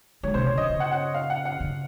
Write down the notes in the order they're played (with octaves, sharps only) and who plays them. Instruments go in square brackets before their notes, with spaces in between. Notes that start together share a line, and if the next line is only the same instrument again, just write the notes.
[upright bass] G#3 [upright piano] C#5
[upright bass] C3 [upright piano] C5
[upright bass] C#3 [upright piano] C#5
[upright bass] D#3 [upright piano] D#5
[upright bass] C#3
[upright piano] F#5
F#5
F5
F#5
F#5
[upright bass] C#3